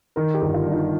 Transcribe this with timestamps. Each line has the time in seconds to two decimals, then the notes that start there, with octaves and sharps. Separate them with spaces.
0.16 D#3 A#4
0.34 G4
0.42 G1
0.47 G4
0.54 F4
0.65 G2
0.72 D#4